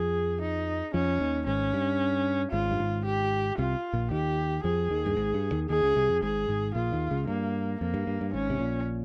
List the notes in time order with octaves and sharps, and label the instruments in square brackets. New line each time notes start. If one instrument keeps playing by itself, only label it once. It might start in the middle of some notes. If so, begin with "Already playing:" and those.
Already playing: [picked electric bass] F2 F3 [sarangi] G#4
[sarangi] D#4
[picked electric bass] F2 F3 [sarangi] C#4
[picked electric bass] D#2 D#3
[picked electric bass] G#1 G#2 [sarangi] C#4
[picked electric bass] G2
[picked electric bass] G#1 G#2 [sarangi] F4
[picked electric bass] G2
G#1 G#2
[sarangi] G4
[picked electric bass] C2 C3 [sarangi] F4
[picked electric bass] A#1 A#2
[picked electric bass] D#2 D#3 [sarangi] G4
[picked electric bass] F2 F3 [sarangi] G#4
[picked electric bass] D#2 D#3
G2
G#1 G#2
G2
D#2 D#3
[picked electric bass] D#2 D#3 [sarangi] G#4
[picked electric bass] C#2 C#3
C2 C3
F2
[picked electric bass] G#1 G#2 [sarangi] G#4
[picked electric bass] G#1 G#2
[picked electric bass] A#1 A#2 [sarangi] F4
[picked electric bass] D#2 D#3
C#2 C#3
[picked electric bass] G2 [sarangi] A#3
[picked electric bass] F2 [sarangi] A#3
[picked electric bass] G2
G2
G2
[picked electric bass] G#1 G#2 [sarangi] C#4
[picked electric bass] C3
A#1 A#2